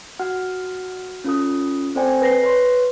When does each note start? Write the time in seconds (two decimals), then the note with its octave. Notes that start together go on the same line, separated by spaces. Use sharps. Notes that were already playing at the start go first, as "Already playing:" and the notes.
0.19 F#4 F#5 F6
1.24 C#4 F4 A4 D#6
1.95 C4 A4 C5 D5 G5 G#5
2.21 B4 A#6 C7
2.43 B4 C#5 C6